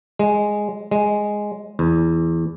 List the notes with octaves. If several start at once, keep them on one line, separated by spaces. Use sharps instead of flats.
G#3
G#3
E2